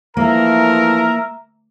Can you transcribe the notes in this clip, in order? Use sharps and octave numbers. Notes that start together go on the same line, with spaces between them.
E3 F3 A3 A#3 A#4 E5 A#5